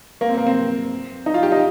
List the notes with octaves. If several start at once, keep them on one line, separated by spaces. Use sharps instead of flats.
A#3
C4
A#3
C4
D#4
F4
G4
D#4